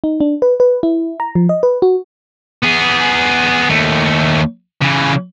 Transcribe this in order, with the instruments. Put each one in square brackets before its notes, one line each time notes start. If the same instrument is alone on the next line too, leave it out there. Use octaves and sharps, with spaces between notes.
[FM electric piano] D#4
D4
B4
B4
E4
A#5
F3
D#5
B4
F#4
[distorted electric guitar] B3 G#4
D#2 A3
C#3 E3